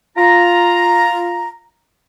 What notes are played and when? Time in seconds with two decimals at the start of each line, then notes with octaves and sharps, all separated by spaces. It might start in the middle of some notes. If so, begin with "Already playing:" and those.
0.17 F4 A#5